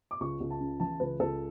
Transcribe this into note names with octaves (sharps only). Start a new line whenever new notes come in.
D6
C#2 C#6
C#2
A5
C#3
E3 A5
C#2 B4
C#2 A4